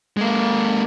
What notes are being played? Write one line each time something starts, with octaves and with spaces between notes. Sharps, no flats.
G#3 A#3